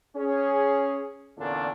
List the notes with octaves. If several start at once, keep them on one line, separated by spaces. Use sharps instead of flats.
C#4 G#4
E2 A#2 D3 C#4 D4 A4